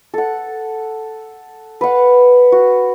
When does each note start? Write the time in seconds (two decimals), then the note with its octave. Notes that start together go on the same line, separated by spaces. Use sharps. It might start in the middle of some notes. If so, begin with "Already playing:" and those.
0.14 A4 F#5
1.81 B4 F5 F#5
2.52 F#4